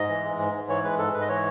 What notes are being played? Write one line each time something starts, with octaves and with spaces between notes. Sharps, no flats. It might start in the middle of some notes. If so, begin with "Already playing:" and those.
Already playing: G#2 D#5
E3
G#3
G#2
G#2
E3 C#5
G#3 B4
G#2 A4
G#2 B4
D#5
E3 C#5